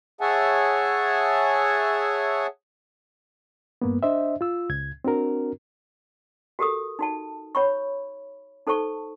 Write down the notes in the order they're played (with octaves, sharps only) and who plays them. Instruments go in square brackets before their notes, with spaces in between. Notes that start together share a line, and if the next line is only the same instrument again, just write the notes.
[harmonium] G#4 C#5 E5 F#5 G#5 A5
[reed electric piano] G2 A#3 B3
D4 C5 D#5 E5
F4 E6
C#2 G#6
C4 D4 F#4 A#4
[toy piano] F#4 G4 A4 A#4 D#6
D#4 F#4 A5
C#5 B5 C#6
D#4 A4 C5 A5 C#6